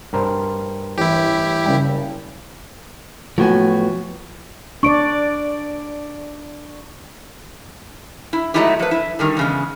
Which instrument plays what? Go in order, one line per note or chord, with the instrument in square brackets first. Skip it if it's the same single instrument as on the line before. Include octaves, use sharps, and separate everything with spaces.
[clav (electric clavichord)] G2 A#4 C5
[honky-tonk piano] A1 [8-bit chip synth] E4 G4
[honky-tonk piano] F#1 C#3 G3
[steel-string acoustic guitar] A2 F#4 G#5 [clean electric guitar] F3 F#3 B3
[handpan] D4 D5 [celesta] C#6 D7
[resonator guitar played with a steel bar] E4
F#3 G#3 A3 D#4 E4 G4
F3 B4
E4
D3 D#3 G3
E2 C#3 G#3